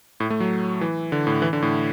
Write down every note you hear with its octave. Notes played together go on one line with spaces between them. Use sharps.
A2
A3
F#3
E3
D3
A2
E3
D3
A2